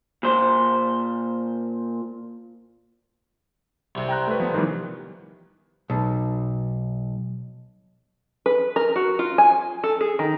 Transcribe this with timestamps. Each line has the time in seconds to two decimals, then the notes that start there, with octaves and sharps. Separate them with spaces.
0.23 A#2 C5
3.95 C2 C3
4.09 G5 A#5 F#6
4.27 A3 B4
4.40 F3 B3
4.54 D#3 E3 G3
5.90 B1
8.46 B4
8.76 A#4
8.96 F#4
9.19 F4
9.38 G#5
9.84 A4
10.01 G#4
10.19 D#3